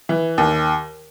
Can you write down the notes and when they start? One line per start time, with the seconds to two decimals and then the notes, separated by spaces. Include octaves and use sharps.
0.09 E3
0.38 D#2